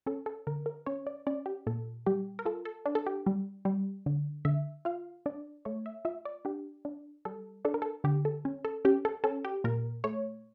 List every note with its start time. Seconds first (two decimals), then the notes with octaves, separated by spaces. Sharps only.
0.06 C#4 A4
0.26 A4
0.47 D3 A#4
0.66 A#4
0.86 C#4 C#5
1.07 D5
1.27 C#4 D5
1.46 G4
1.67 A#2 A4
2.06 G3 G4
2.39 A#4
2.45 F4 A4
2.65 A4
2.86 D4
2.95 A4
3.06 G4
3.26 G3
3.65 G3
4.06 D3
4.45 D3 E5
4.85 F4 F5
5.26 D4 D5
5.65 A3 C#5
5.86 E5
6.05 F4 E5
6.25 D5
6.45 D4 G4
6.85 D4
7.25 G3 A4
7.65 D4 A4
7.74 A#4
7.82 A4
8.04 D3 G4
8.25 A4
8.45 C#4
8.65 A4
8.85 C#4 G4
9.05 A4
9.24 C#4 A4
9.45 G4
9.64 A#2 A#4
10.04 A3 C#5